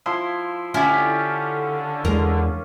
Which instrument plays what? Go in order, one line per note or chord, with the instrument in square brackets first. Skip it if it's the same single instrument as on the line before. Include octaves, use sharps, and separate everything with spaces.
[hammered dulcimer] F3 E4 C6
[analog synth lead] D3 [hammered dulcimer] C#4 F4 G4 [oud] E4
[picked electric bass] E2 G#3 [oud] A#4